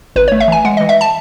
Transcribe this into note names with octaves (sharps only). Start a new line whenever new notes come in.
G#1 B4
C#5
A3
E5
E3 G#5
G#3 F#5
D#5
E3
E5
A5